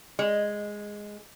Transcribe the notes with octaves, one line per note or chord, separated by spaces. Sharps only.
G#3